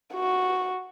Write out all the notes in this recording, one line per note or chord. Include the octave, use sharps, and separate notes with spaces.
F#4